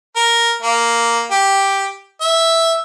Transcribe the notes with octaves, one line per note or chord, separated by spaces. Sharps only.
A#4
A#3
G4
E5